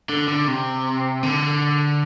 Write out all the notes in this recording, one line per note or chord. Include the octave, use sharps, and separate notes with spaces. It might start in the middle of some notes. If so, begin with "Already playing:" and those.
D3
D3
C3
D3